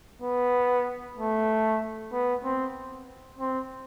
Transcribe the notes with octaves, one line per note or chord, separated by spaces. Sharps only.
B3
A3
B3
C4
C4